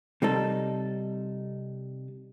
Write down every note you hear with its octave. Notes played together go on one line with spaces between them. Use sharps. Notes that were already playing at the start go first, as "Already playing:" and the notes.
C3 G3 D#4 A4